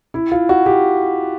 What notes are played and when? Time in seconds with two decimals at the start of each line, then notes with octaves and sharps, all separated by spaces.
0.14 E4
0.32 F4
0.49 F#4
0.66 G4